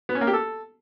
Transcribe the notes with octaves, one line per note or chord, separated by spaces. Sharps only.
B3
C#4
A#3
G4
A4